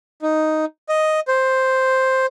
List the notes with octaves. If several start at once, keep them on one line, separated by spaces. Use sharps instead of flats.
D#4
D#5
C5